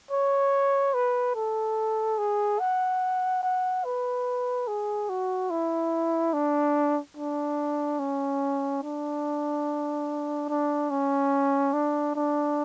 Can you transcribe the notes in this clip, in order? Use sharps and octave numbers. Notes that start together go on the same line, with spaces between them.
C#5
B4
A4
G#4
F#5
F#5
B4
G#4
F#4
E4
D4
D4
C#4
D4
D4
C#4
D4
D4